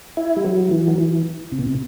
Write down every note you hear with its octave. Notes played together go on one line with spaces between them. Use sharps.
E4
G3
F#3
E3
F#3
E3
C3
B2
C3